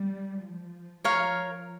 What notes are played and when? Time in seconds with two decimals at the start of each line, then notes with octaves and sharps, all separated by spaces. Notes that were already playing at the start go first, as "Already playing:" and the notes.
Already playing: G3
0.40 F3
1.04 F3 A#4 C#5 F5